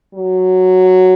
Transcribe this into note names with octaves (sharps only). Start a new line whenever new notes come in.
F#3